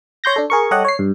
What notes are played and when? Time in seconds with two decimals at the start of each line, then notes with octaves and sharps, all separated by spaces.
0.24 C#5 C6 G6 A#6
0.36 D4 A4
0.50 G#4 A#4 C#6
0.71 G3 G4 A4 C#5 D#5 F#5
0.85 C#5 C7
0.99 G2